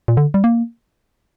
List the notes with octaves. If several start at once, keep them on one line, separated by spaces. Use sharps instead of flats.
A#2
D3
G3
A#3